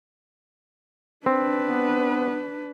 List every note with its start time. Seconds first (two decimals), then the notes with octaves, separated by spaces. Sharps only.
1.26 C4 D4 B4
1.65 B3